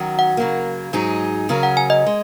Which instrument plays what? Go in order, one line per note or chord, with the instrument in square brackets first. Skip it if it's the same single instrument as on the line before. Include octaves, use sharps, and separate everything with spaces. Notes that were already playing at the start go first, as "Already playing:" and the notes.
Already playing: [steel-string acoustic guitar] D#3 F#3 C#4 F#4
[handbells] F#5
[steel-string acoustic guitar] C#3 F#3 A#3
G#2 F#3 D#4 G#4
C#3 F#3 C#4 A#4
[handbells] F#5
G#5
D#5
[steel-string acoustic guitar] G#3